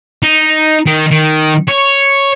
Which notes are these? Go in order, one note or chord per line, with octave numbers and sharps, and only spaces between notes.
D#4
D#3
D#3
C#5